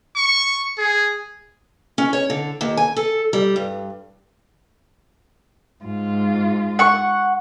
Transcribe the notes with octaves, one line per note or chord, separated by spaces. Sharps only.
C#6
G#4
C#4
C#5
D3
D#2
G#5
A4
G3
G2
G#2 F4
F#5 C#6